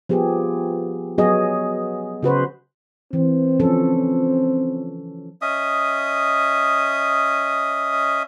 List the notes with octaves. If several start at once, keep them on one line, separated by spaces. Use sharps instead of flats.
F3 B3 G4 G#4
F#3 B3 F#4 G#4 D#5
C#3 F#4 B4 C5
E3 C4
F3 C#4 A4
C#4 D#5 E5 D#6